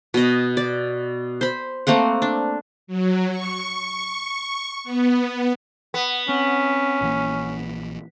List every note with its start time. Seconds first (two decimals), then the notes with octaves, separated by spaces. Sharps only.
0.14 B2 D#5
0.57 D5
1.41 C5 B5
1.87 A3 A#3 C4 F#5
2.22 D4
2.87 F#3
3.30 C#6
4.84 B3
5.94 B3
6.29 C4 C#4
7.01 A#1 E3 A#3